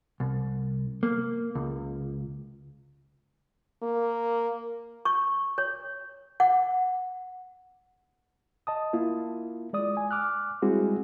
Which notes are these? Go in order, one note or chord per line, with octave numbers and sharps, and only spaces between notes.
C2
A#3
C#2
A#3
C#6
C#5
F#5
D#5 A5 D#6
A#3 E4 F4
G#3 D5 D#6
G#5
D6 F6 F#6
G3 G#3 C4 E4 F#4 G#4